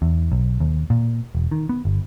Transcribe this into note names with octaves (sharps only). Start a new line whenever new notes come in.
E2
B1
D#2
A#2
E1
D#3
B3
G1